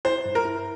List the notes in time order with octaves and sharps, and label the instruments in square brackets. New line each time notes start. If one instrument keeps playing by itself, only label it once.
[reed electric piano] E4 [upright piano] C5
[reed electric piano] G2
[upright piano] A#4
[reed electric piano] E4